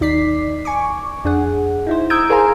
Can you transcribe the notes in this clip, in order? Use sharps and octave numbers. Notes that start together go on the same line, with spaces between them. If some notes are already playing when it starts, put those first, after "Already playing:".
D#2 D#4 D5 B6 C7
G#5 C#6 D6
F2 D4 G#4 F#5
D#4 E4 C5
A#5 D#6 E6 G6 G#6 D7
G#4 A#4 C5 F5 G#5 A#5